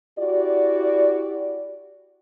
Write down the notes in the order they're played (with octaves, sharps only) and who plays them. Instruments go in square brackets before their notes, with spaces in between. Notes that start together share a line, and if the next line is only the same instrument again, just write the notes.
[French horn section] E4 F#4 G4 D5